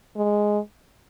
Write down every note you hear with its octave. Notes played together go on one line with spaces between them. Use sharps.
G#3